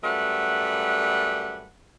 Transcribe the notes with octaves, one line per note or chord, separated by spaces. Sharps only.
F#2 G3 A3 B4 F#5